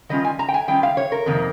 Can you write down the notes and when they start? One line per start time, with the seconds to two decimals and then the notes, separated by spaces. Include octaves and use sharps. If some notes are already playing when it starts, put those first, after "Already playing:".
0.09 D#3 G3 C#4 F4 D#5
0.24 G#5
0.39 A#5
0.48 G5
0.54 G#5
0.68 D#3 G3 C#4 F4 G5
0.83 F5
0.97 C#5
1.12 A#4
1.26 F2 C3 D#3 A#3